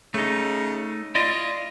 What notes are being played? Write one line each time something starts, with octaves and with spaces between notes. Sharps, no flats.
C#3 A3 D#4
E4 F4 D5 D#5